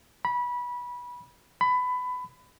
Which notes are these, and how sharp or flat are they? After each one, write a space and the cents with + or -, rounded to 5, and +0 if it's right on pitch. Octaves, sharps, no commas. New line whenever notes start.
B5 -20
B5 +20